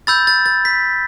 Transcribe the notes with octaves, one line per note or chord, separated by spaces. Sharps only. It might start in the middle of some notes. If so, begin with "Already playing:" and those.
B5 E6 G6 A6
A6
A6
B6